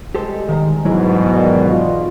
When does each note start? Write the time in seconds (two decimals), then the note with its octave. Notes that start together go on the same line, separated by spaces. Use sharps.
0.15 G3 G#3 G4 A4 C5
0.49 D#3 E5 A#5
0.85 G#2 B2 E3 F#3 E4
1.34 D#3 F4 D5
1.70 F4